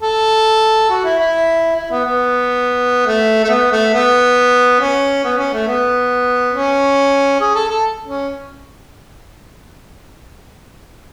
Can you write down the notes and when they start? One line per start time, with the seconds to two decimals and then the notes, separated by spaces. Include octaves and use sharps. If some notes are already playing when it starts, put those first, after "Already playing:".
0.02 A4
0.90 F#4
1.05 E4
1.19 E4
1.76 E4
1.91 B3
2.05 B3
3.06 A3
3.44 A3
3.49 B3
3.72 A3
3.94 B3
4.80 C#4
5.24 B3
5.38 C#4
5.53 A3
5.68 B3
6.53 C#4
7.40 G#4
7.55 A4
7.69 A4
8.06 C#4